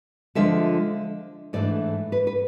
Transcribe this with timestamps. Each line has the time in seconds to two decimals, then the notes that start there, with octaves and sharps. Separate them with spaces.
0.35 D3 F3 G#3 D4 F4 E5
1.53 G#2 E3 A3 D4 D5
2.12 B4
2.27 B4